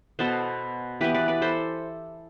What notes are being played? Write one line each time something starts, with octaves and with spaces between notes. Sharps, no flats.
B2 B3 A4 C5
E3 B3 G4 B4
B4 D5
B4 D5
A4 C5